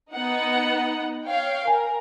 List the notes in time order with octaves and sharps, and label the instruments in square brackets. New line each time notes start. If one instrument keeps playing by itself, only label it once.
[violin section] B3 D#4 F#5
C#5 F5 G5
[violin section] A#4 [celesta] G#5